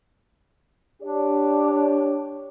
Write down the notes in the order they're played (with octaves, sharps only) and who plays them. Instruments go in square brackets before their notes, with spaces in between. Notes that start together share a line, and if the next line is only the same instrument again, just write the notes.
[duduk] D4 [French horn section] G4 C#5 D5